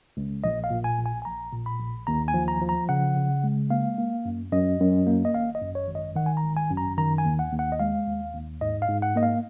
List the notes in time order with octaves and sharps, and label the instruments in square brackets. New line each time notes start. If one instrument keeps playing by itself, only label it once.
[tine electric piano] C#2
A#1 D#5
F5
A#2
G#5
A#1
G#5
G#5
A#1 A#5
A#2
B5
A#1
D#2 A#5
G#5
F3
A#5
F3
A#5
C#3 F#5
C#3
G#3
A#3 F5
A#3
F#2
F#2 D#5
F#2
A#3
D#5
G#1 F5
D#5
F#2
C#5
G#1
D#5
D#3 F#5
G#5
A#5
G#1
G#5
F#2
A#5
D#3 A#5
G#5
D#2
F#5
D#2
F#5
D#5
G#3 F5
D#2
D#2
G#2 D#5
F5
G#2
F#5
A#3 D#5
F5